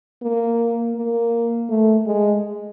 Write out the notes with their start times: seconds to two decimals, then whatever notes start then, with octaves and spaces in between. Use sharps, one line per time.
0.23 A#3
0.96 A#3
1.70 A3
2.06 G#3